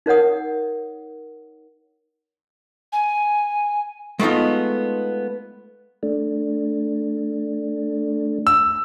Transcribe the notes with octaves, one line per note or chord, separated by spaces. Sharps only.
D#4 A#4 C#5 F#5 D#6
G#5
G#3 A3 B3 D#4 F4
A3 D4
E6